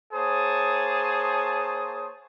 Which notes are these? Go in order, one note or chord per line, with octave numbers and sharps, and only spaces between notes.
A#3 G#4 C5 C#5 A5 D#6